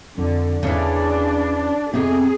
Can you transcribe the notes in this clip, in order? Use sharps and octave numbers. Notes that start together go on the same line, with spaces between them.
F2 D3
E2 C#3 E3 D4
F2 C3 B3 C4 G#4